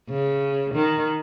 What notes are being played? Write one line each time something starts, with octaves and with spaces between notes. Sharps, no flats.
C#3
D#3